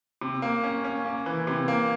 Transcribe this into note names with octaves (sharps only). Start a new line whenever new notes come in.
C3
A#3
C#4
C#4
A#3
E3
C3
A#3